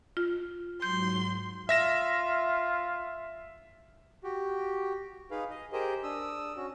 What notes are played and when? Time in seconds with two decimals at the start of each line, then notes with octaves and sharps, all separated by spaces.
0.17 F4
0.82 G#2 F#3 C6 G6
1.69 F4 E5 A#6 E7
4.24 F#4 G4
5.31 D#4 G#4 B4 F5
5.50 D#5
5.73 G4 G#4 A#4 C5 D#5
6.03 D4 D#6 E6
6.57 C#4 F#4